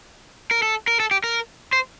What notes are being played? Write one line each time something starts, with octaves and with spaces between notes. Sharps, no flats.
A#4
A4
A#4
A4
G4
A#4
C5